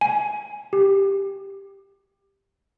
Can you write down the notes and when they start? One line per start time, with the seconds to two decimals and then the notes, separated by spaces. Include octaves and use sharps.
0.01 G#5
0.73 G4